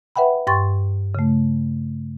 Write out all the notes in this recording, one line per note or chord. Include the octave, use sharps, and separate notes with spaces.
B4 E5 F#5 G5 B5
G2 G5 C6 C#6 A6
C#3 A3